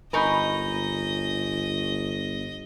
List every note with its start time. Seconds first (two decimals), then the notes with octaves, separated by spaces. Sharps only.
0.13 G1 D#4 A#4 B4 D#5 G#5 C#6 G6